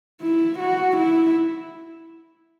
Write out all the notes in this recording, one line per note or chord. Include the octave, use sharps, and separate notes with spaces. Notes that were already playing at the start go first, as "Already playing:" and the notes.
E4
F#4
E4